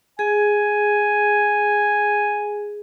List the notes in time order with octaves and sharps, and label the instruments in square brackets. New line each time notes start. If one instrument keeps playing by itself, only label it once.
[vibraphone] G#4 [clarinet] G#5